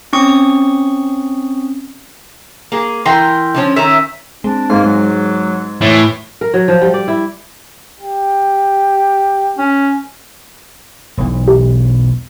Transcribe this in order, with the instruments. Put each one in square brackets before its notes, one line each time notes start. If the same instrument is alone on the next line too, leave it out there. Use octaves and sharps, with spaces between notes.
[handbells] C4 C#4 C#6 D#6
[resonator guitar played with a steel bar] A#3 G#4
[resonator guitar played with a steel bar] E3 A#4 [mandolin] G5 A#5 C6
[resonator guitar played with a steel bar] D3 F3 C#4
[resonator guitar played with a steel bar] D#3 C#4 A#4 [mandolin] E5
[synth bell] G#3 C4 [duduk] D4
[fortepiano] G#2 [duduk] A#3 [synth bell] C6
[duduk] F#3 [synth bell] G#3
[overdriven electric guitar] A2 [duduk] E3 [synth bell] C#5
[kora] A#4
F#3
F3
G3
D5
E4
[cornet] G4
[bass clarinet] C#4
[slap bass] E1 B1
[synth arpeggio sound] G4